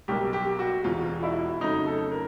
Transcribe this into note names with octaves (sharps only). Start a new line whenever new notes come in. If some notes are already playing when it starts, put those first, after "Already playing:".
B1 B2 G3 A#3 G4
G4
F#4
E1 E2 B2 F4
E4
F2 C#3 F#3 A3 D#4
A4
A#4